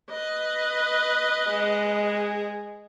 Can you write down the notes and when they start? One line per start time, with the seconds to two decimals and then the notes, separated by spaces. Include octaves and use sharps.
0.11 B4 D#5
1.50 G#3